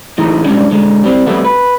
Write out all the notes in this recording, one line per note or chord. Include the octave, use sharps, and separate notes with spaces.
A2 E3 D#4 G#4
G3 G#3 C#4 D4
D3 G#3
G3 C4
F2 G3 A3 B3
B4